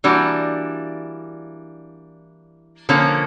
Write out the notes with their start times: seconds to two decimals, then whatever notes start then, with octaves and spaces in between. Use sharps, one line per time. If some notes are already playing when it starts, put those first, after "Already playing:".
0.04 E3 G3 A#3 D4 F#4
2.89 D3 F3 A#3 C#4